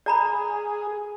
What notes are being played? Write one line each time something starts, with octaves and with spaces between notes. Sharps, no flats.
G#4 D5 A#5 B5